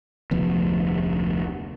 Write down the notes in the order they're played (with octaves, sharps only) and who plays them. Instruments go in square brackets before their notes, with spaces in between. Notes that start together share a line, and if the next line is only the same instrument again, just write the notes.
[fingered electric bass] F1 D2 F3 B3